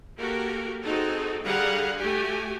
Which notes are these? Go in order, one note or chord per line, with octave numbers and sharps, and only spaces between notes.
A#3 F#4 G4 A4 A#4
C4 D#4 F#4 G#4 A4
D3 G3 G#4 F5 F#5 A#5
A3 F#4 G4 G#5